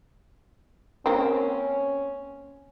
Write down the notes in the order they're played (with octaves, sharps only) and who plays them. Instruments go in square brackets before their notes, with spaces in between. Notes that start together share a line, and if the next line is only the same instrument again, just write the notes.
[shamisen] A#3 C4 [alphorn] C#4